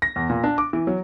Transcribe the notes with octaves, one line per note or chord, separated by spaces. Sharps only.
A#6
E2
A#2
D4
D6
E3
F#3